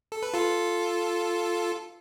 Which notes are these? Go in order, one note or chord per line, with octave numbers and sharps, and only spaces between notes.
A4
B4
F4 A4